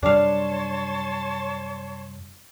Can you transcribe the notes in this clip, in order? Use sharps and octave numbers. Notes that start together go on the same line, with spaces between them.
F#2 C3 G3 D4 C#5 F5 A5 C6